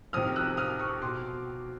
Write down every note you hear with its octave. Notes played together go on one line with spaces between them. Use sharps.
F2 C3 D#3 D#6 F6
E6 F#6
D#6 F6
C#6 D#6
B2 C6 D6